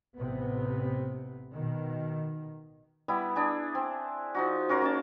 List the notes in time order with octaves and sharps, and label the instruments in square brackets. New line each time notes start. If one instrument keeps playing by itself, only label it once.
[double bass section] A1 C3 B3
B2 D#3
[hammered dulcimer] G3 B3 E4 B5
D4 G#4
C4
F3 D#4 F#4
C#4 F#4 A#4 C6
A#3 C#4 A5